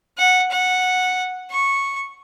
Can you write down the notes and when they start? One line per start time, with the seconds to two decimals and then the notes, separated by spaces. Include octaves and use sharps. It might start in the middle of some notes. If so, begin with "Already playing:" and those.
0.18 F#5
0.51 F#5
1.51 C#6